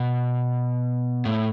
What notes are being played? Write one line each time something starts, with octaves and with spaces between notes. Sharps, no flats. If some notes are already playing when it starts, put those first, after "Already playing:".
Already playing: B2
A2